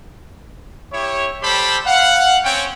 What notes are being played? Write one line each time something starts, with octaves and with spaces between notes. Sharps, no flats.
E4 G4 C#5
G3 G4 A4 C5 B5
F5 F#5
C4 C#4 C#5 G5